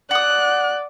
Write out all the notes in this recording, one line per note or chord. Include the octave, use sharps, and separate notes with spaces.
D5 F#5 D#6 F#6